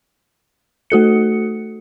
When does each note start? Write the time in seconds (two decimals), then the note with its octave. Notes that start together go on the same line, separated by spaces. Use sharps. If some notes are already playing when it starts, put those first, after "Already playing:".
0.90 A3 F#4 A4 C#7